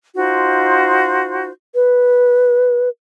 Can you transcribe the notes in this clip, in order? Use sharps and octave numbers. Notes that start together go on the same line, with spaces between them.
D#4 F4 F#4 C5
B4